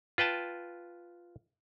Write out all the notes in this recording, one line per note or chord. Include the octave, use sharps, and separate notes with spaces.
F4 B4 G5 A5